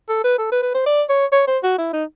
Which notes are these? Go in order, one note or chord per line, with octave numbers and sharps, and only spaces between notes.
A4
B4
A4
B4
B4
C5
D5
C#5
C#5
C5
F#4
E4
D#4